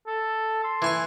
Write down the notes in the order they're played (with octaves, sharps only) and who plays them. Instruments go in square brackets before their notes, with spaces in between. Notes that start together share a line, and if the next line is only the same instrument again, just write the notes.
[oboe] A4
C6
[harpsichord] E3 G#5 C#6